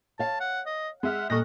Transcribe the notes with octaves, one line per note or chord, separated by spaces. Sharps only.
C#5 F5 A5
F#5
D#5
G#3 E5 F#5 F6
A#2 G3 A4 D#5 C#6 F#6 A#6